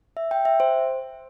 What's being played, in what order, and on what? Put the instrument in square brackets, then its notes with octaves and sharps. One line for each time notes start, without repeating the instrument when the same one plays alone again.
[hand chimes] E5
G5
E5
C5